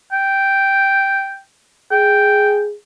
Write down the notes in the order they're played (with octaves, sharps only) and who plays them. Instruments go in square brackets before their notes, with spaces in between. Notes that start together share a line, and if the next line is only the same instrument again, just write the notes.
[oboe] G5
[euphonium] G#4 [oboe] G5